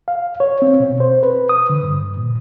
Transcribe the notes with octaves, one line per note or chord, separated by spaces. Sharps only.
F5
C#5
C4
B2
C5
B4
D#6
D3
G2
A#2